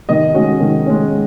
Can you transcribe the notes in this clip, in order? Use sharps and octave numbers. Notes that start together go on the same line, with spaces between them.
D#3 D#5
G#3 C#4 F#4
D#3
G#3 C#4